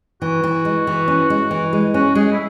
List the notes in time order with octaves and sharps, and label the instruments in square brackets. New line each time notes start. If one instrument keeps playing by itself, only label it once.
[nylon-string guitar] E3 [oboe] F#4
[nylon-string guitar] E3
G#3
E3
C#4
G#3
E3
G#3
[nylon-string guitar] C#4 [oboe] F#4
[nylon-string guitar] G#3 [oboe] G#4
[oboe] E4